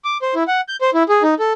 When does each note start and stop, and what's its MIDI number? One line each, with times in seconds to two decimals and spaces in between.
0.05 0.18 86
0.22 0.34 72
0.35 0.43 64
0.48 0.61 78
0.68 0.76 91
0.81 0.90 72
0.94 1.03 64
1.09 1.23 68
1.23 1.35 63
1.39 1.53 69